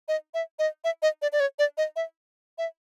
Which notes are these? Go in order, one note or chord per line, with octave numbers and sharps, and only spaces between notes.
D#5
E5
D#5
E5
D#5
D5
D5
C#5
D5
D#5
E5
E5